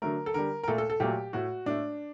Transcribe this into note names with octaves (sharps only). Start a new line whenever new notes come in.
D3 F#3 A3 A#4
A4
D3 G3 A#4
A#4
A#2 A3 A4
A4
A4
A#2 F#3 A3 G4
A2 A3 F#4
A2 A3 D4